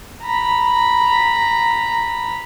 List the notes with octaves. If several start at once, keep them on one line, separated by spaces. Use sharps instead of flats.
A#5 B5